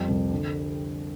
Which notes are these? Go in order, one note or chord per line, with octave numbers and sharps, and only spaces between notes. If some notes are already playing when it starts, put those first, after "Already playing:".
Already playing: F2 G3
C2
D3